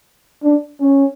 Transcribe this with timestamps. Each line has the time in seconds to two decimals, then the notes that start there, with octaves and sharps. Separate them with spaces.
0.43 D4
0.80 C#4